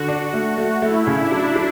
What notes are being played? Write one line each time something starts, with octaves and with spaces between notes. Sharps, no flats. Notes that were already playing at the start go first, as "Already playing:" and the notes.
Already playing: D3 F#4
D4
A3
A3
A3 E4
C#3
D4
F#3
F#3